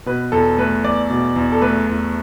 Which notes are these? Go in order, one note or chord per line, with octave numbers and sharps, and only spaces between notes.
B2 B4
E2 A4
A3 B4
E2 D5
B2
E2
A4
A3 B4
E2